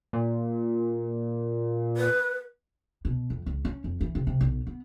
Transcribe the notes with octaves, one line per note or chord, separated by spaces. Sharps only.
A#2
B4
B2
F2
C#2
C#4
F2
E3
C3
C3
B1
B3